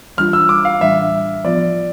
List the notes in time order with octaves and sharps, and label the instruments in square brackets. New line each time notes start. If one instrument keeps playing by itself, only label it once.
[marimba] E3 G3 D4 F4 [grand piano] F6
[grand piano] E6
D6
F5
[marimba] A2 E3 G3 D4 [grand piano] E5
[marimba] F3 B3 F4 [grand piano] D5